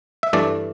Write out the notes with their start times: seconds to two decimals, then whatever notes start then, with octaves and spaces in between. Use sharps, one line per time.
0.23 E5
0.33 G2 E3 A3 D5